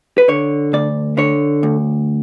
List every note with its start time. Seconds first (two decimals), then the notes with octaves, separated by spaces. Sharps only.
0.18 B4
0.28 D3 C#5
0.73 D2 D5
1.18 D3 C#5
1.63 D2